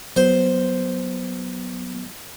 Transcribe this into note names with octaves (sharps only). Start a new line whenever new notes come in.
F#3 B3 C5